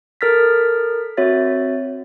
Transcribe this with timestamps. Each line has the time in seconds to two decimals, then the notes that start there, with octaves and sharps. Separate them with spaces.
0.21 A4 A#4 F6 A6 B6
1.17 C4 F#4 C#5 E5 A6